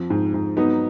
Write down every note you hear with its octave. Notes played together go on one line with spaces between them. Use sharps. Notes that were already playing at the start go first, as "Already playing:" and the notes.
Already playing: F2 F3
G#2
G#2
F#3 B3 D#4